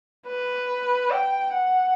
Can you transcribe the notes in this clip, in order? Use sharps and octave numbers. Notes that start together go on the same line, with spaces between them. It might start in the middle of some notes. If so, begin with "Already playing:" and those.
B4
G5
F#5